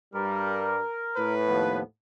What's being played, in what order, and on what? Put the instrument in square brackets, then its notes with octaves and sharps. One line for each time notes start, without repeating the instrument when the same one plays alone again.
[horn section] G2 G3 [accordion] A#4
[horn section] A2 B4
[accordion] D#2 F3 B3